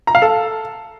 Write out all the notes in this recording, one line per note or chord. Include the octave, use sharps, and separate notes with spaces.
A#5
F5
A4